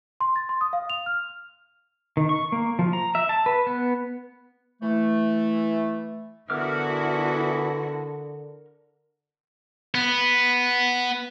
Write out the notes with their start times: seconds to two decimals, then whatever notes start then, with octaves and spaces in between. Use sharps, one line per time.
0.21 C6
0.36 A6
0.49 C6
0.61 D#6
0.73 F5
0.90 F7
1.06 F6
2.17 D#3
2.29 C#6
2.52 A#3
2.79 F3
2.93 A#5
3.15 E5
3.29 A5
3.46 B4
3.67 B3
4.82 E3 A3
6.50 D3 E3 B3 E4 F#4 A#4 D6 F6
9.95 B3